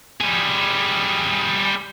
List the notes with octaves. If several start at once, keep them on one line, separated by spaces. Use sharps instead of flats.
G3 G#4